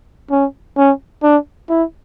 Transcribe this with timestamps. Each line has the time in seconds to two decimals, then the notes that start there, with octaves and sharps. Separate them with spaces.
0.31 C#4
0.77 C#4
1.23 D4
1.69 E4